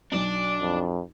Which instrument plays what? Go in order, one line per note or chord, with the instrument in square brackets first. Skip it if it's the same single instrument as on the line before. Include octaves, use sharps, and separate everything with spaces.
[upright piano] B1 F#3 [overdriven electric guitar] D4 D5
[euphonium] F2